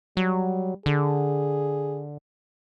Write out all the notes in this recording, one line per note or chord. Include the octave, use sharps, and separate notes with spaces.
F#3 G3
D3 G#4